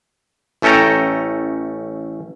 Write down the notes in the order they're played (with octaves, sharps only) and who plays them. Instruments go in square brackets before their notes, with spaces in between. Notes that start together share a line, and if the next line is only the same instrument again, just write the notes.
[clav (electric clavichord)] A1 A3 C#4 A4 G5 A#5